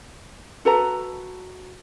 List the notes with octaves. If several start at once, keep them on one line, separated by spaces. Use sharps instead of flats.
F#4 A4 B4 A#5